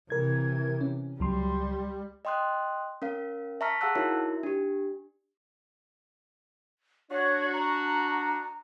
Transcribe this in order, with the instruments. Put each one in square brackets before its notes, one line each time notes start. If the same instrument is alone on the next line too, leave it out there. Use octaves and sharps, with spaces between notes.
[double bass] C3 E3 [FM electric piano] A#4 G#6
[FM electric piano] C#4
[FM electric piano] C#2 F#3 C6 [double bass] G3
[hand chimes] D#5 G5 C6 D#6 F#6
C#4 A#4 F5
E5 A5 A#5 C#6 F6 B6
G#4 F5 F#5 A5 E6 F#6
D#4 E4 F#4 A#4 C#5 E5
D4 G4
[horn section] D4 F#4 [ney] C#5
[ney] A#5